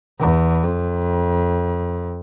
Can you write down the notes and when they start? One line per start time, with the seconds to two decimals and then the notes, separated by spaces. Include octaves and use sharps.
0.19 E2
0.64 F2